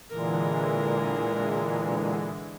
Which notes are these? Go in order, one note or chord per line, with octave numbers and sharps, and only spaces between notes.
A#2 D3 E3 G#3 A#4